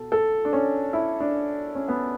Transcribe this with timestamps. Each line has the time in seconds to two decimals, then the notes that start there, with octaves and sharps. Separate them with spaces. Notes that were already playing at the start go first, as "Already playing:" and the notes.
Already playing: B2 A4
0.12 A4
0.45 D4
0.53 C#4
0.93 E4
1.20 D4
1.75 C#4
1.88 B3